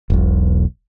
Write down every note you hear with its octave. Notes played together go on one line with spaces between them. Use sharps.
E1 B1